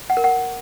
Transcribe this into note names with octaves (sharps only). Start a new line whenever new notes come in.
F#5
A#4
F#5